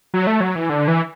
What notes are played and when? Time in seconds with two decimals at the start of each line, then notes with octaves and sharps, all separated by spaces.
0.14 F#3
0.27 A3
0.40 F#3
0.56 E3
0.70 D3
0.88 E3